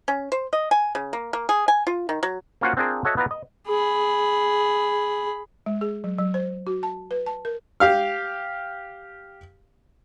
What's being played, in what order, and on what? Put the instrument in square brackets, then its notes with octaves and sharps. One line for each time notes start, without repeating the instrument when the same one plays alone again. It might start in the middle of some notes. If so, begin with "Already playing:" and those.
[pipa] C#4
C5
D#5
G#5
C#3
A#3
A#3
G#4
G#5
F4
D#3
F#3
[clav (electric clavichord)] A#3 C#4 F4 F#4 C5 F#5
C4 D4 F4 G#4 A#4 C5
F#4 A4 C#5 D#5 E5 F#5
B3 E4 F4 B4 D5 A#5
D#5
[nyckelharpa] G#4 B5
[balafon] G#3
G#4
F#3
F#3
C5
F#4
A5
B4
A5
A#4
[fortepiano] G4 F5 F6